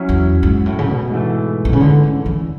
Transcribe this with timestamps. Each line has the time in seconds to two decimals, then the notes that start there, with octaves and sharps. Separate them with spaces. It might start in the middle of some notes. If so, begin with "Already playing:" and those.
Already playing: F#3 C#4 E4
0.09 E2
0.43 G#2
0.66 A2
0.79 C#3
0.89 B2
1.11 G#2 E3 A3
1.65 B2
1.73 C#3
1.80 D3
2.03 C#3
2.26 E3